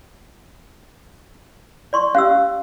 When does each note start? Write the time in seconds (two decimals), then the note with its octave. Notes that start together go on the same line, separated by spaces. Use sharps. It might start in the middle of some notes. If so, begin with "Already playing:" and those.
1.93 D5 C6 C#6
2.15 C#4 G4 F5 E6